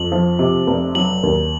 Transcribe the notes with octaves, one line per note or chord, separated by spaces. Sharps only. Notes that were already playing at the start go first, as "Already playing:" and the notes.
Already playing: F2 F#7
F3
C3
F1
F#3 F#7
D#2